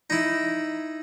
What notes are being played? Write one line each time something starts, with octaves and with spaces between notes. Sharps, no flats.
D#4 E4